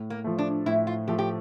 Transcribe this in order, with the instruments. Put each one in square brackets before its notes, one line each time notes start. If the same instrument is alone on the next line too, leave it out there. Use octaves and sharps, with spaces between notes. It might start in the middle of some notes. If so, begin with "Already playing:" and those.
Already playing: [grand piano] A2
[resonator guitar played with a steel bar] A#3
[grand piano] F3 A3
[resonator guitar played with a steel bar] D4
[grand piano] A2 [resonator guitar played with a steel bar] E4
[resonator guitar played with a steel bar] F4
[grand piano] F3 A3 [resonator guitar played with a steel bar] G4
[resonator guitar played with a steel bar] G4